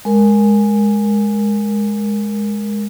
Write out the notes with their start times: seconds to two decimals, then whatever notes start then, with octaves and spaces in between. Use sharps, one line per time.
0.05 G#3 A#4